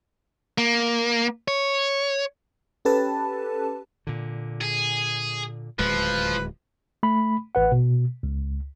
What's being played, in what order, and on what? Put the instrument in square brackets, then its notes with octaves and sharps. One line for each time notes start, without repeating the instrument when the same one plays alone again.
[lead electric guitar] A#3
C#5
[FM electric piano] C#4 G4 A4 B4 A5
[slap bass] A#2 D3
[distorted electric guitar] G#4
[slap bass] D1 D#2 G#3 [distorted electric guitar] F3 [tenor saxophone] B4
[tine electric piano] A3 B5
A1 B4 F#5
B2
C#2